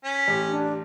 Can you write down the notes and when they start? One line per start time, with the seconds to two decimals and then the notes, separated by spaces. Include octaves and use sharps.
0.04 C#4 B6
0.28 A1 G4
0.48 D4